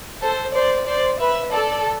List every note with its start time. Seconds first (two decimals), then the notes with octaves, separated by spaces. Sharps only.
0.22 A4 C5
0.55 C5 D5
0.87 C5 D5
1.20 B4 E5
1.53 A4 D5